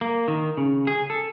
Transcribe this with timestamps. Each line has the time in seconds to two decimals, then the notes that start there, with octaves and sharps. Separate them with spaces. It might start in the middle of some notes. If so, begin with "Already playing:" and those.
0.01 A#3
0.28 D#3
0.57 C#3
0.87 G#4
1.10 A4